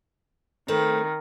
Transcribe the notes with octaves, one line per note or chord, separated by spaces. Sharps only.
D#3 A3 C4 B4